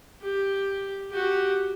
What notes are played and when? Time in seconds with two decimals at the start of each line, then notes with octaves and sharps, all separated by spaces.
0.22 G4
1.11 F#4 G4